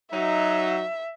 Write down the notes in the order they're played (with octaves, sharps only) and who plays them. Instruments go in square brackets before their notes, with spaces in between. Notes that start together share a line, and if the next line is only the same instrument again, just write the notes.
[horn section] F#3 D#4 [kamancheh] E5